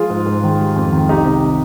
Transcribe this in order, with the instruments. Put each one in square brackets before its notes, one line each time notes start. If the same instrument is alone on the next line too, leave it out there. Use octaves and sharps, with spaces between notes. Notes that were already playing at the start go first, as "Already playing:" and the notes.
Already playing: [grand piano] F3 G#3 F4 G#4
G#2
G#2
D#3
G3
F2
D#3
C2 D#4 G4
C3